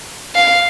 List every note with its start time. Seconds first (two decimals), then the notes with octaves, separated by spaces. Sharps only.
0.35 F5